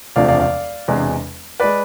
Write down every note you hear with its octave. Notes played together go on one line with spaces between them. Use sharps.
E1 D2 C3 F3 A3 D5 F5
D5 F5
D5 F5
E1 E2 C3 G#3 D4
G#3 B4 D5